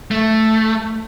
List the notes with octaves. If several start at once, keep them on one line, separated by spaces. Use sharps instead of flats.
A3